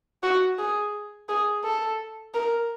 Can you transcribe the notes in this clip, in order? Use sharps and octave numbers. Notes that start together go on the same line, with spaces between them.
F#4
G#4
G#4
A4
A#4